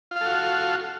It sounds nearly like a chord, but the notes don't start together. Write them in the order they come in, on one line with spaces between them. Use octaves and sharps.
F4 F5 A4 F#4